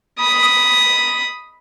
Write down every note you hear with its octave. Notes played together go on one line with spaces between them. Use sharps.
B5 D#6